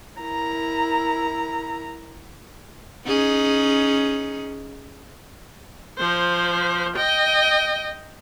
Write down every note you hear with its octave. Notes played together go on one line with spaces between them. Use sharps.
E4 A#4 A#5
C#4 D#4 G#4
F3 C5
D#5 G5